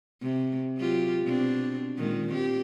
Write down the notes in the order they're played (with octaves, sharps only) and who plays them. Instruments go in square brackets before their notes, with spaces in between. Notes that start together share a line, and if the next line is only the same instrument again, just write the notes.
[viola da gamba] C3
F#3 F4 G4
B2 C4 D4
A#2 D#3 G#3
C4 G4